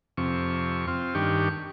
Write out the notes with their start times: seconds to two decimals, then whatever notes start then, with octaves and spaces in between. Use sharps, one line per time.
0.17 F2 C3 C#6
0.87 C4 F4
1.15 G2 D#3 D4 G4 C#6